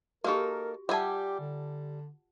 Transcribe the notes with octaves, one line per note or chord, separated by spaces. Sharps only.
A#3 D#4 F#4 G4 A4 A#4
G3 F4 G4 E5 F#5 G#5 A5
D3